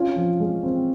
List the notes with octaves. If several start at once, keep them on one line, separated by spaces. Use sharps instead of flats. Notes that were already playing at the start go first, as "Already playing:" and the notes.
Already playing: C#4 F4
F3
G#3
C4